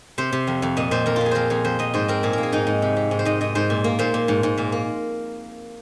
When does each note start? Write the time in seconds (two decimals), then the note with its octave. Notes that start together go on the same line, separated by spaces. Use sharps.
0.18 C3 C5
0.32 C3
0.47 F2
0.62 F2
0.77 A#2 D#5
0.91 A#2 C5
1.06 F2 A#4
1.16 F2 F4
1.26 G#4
1.31 F2 A#4 C5
1.50 F2 G#4
1.64 F2 C5
1.79 F2 D#5
1.94 G#2 C5
2.08 C4 A#4
2.23 A#2 G#4
2.33 A#3 A#4
2.43 G#4
2.52 G#2 D#4
2.67 G#2
2.82 C3
2.97 C3
3.11 G#2
3.19 C5
3.25 G#2 D#5
3.41 G#2 D#5
3.55 G#2 C5
3.70 A#2
3.84 A#3
3.99 A#2 C5
4.14 A#2
4.28 G#2
4.43 G#2
4.58 A#2 A#4
4.72 A#3